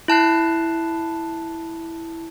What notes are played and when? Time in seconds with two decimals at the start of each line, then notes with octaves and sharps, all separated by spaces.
0.08 E4 A5 F#6 C7